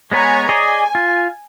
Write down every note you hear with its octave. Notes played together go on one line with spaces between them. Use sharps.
G#3 B3 B4 C#5 G#5 A#5
G#4 D5 D#5 G#5
F4